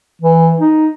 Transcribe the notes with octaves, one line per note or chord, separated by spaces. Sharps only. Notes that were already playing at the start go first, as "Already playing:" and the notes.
E3
D#4